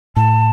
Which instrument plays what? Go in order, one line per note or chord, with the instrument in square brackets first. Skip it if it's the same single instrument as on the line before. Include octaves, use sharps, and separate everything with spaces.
[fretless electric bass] A2 [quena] A5